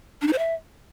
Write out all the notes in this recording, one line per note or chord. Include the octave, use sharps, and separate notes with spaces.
D4
D#4
C5
E5